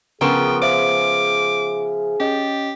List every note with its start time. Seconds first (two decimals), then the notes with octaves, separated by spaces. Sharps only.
0.21 C#3 F3 B3 G#4 A#4 G5 A#5 C#6
0.62 C5 E5 F5 D6
2.20 C#4 G4 D#5